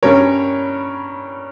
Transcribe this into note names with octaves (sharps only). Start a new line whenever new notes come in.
G2 G3 C#4 A#4 C#5